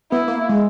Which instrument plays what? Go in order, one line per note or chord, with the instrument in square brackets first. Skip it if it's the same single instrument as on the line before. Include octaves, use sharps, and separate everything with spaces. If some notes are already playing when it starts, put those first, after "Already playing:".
[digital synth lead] B3 [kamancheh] E4
[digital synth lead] A#3
G#3